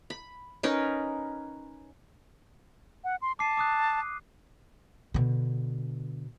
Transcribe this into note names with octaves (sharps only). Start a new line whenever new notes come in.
B5
C#4 D#4 A#4 B4
F#5
C6
A5 D6 C7 D#7
D6 D#6 F#6
B2 D3